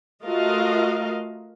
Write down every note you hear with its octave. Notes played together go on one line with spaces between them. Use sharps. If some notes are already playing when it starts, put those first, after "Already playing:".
A3 F4 F#4 A#4 D#5 F5